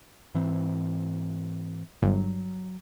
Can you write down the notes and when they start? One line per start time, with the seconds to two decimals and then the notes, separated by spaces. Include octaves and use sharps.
0.34 G#2 E3 C4
2.02 G1 F#3